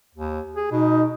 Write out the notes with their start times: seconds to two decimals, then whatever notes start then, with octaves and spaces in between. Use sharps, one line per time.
0.15 D#2
0.56 G#4
0.71 B2 D#4